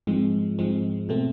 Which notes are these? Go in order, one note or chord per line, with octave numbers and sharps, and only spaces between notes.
G#2 F3 G#3 C4
G#2 F3 G#3 C4
B2 A3 C4